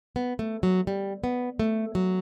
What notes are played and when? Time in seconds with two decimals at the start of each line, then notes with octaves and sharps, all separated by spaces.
0.16 B3
0.39 A3
0.63 F#3
0.87 G3
1.24 B3
1.59 A3
1.95 F#3